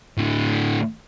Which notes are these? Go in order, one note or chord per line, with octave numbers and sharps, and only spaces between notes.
A2 D3